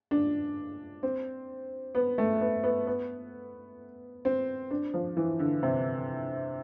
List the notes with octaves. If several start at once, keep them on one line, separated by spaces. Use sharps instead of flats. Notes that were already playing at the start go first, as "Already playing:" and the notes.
D4
C4
B3
A3
B3
B3
B3
C4
D4
F3
E3
D3
C3